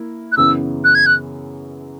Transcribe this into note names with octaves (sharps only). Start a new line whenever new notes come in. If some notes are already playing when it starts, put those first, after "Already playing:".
Already playing: A#3 E4
F#6
F#2 C#3 E3 B3 E4 E6
F#6
G#6
F#6